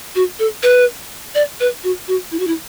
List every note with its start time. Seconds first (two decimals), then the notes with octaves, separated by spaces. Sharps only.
0.15 F#4
0.39 A4
0.63 B4
1.35 D5
1.60 B4
1.84 F#4
2.08 F#4
2.31 E4
2.39 F#4
2.47 E4